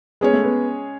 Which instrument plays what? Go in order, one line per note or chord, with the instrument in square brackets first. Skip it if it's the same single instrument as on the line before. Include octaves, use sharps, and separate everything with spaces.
[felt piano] G#3 C#4 G#4 C#5 [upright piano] B3
[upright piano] A3
B3